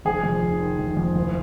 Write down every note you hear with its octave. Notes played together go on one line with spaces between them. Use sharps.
F1 G#4
F2
F1
D#3
F1
F2
F#1